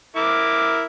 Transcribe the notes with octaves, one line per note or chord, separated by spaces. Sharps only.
E4 A#4 D6